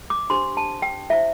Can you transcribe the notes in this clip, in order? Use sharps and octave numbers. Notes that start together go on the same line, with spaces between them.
D6
D4 G4 C5 C6
A5
G5
E4 C5 E5